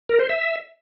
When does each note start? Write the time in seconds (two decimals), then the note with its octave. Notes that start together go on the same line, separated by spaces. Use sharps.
0.09 A#4
0.19 C5
0.29 E5